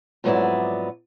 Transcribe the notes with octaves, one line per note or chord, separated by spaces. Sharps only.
F2 G#2 F#3 B3 E4 D5